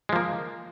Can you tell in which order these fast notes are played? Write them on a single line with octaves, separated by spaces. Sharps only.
G#3 F3 A#3